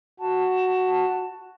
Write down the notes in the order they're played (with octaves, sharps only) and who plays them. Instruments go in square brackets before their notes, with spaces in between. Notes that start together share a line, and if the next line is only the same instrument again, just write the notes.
[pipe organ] F#4 [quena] A5